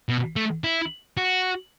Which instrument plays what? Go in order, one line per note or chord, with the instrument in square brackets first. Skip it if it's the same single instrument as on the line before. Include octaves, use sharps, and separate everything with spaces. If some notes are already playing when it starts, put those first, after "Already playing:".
[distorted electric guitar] B2
A3
E4
F#4